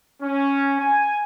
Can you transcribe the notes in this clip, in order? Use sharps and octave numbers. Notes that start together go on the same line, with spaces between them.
C#4
G#5